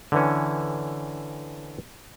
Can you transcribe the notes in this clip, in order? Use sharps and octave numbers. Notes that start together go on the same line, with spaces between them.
D3 E3 C#4